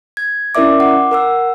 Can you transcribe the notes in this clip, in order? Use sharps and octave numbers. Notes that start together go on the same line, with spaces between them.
G#6
C#4 E4 A#4 D5 E5 D6
F#5 D6
A#4 F#5 E6